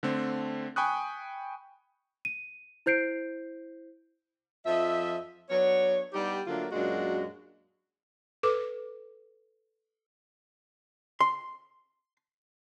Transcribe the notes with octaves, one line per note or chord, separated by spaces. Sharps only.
D3 A3 C4
G5 G#5 B5 C#6 D#6 F#6
D#7
E4 C5 G6 C7 D7
F2 F3 D#5 E5
F#3 B3 D4 C#5
G3 B3 D4 D#4 G4
D3 F#3 A3 A#3 D4 F4
F#2 A#2 F#3 G#3 D4 F#4
A4 B4 D6
C6